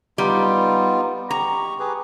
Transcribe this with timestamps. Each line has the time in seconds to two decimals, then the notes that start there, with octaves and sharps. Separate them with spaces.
0.18 G3 B3 D#4 F4
1.30 G4 A#5 C#6
1.79 G4 G#4 B4